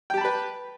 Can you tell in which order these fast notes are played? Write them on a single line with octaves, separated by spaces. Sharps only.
G5 G4 A5 B5 B4